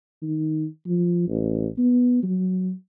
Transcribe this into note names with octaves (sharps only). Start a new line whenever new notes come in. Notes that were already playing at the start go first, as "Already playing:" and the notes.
D#3
F3
A1
B3
F#3